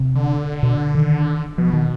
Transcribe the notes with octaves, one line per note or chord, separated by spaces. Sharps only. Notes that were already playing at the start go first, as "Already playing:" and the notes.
Already playing: C3
D3
B2
D#3
B2 F3
D#3